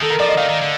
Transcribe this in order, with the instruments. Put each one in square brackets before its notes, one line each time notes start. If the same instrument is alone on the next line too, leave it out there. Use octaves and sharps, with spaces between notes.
[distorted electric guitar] D#3 [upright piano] A4
[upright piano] A#4
[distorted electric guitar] F3 [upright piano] D5
[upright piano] D#5
[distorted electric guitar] D#3 [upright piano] F5
[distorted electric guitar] D#3
D3